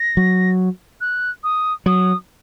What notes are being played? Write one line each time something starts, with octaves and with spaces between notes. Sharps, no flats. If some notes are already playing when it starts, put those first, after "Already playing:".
Already playing: A#6
F#3
F#6
D#6
F#3 D#6